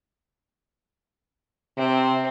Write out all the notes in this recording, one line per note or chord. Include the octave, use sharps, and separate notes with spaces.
C3 C4